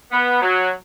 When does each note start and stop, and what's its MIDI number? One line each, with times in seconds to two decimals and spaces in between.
0.12 0.39 59
0.42 0.70 54